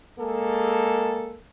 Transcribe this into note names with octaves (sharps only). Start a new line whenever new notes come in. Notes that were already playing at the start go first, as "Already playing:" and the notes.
G#3 A#3 G#4 A4